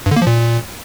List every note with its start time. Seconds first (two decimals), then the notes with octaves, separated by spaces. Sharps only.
0.06 G2
0.11 D3
0.16 A#3
0.22 F3
0.27 A#2